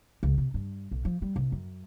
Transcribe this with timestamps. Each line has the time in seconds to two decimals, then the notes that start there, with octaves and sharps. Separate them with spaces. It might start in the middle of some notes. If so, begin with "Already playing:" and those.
0.23 C#2
0.38 C3
0.54 G2
0.91 B1
1.05 F3
1.22 G3
1.36 C2
1.52 F#2